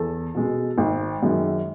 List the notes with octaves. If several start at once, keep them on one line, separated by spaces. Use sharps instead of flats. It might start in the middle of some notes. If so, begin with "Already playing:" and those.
Already playing: E2 A4
B2 G#3
G#1
F#2 D#3 G#3